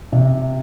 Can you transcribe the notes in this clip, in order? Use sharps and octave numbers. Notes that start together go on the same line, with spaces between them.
C3